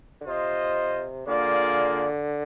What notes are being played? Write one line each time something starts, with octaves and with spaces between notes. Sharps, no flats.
D3
C3 F4 C5 D#5
D3 A#3 F4 G#4 D5